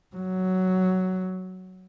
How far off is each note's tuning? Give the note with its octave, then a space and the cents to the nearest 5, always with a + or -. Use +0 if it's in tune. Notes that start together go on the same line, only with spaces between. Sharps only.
F#3 +5